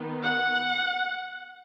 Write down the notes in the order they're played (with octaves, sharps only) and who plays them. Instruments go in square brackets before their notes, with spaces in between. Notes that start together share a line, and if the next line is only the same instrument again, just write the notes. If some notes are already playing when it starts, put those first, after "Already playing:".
Already playing: [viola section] D#3 B3
F#5